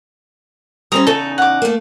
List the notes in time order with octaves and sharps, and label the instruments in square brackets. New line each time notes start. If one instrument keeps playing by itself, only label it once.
[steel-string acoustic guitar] G3 C4 C#4 [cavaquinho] A#5 D#6
[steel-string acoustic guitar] E2 C#3 D#4 [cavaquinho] A4
[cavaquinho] F#5 D6
[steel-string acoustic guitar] A3 A#3